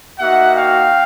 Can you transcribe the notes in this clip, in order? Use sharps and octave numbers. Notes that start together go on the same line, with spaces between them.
A#3 D#4 F#4 E5 F#5
F5 G5